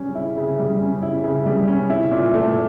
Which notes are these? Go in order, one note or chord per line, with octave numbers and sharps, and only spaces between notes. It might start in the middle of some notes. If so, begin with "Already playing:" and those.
Already playing: C#3 G3 C#4
E4
C#3
G3
C#4
E4
C#3
G3
C#4
E4
A#2
A3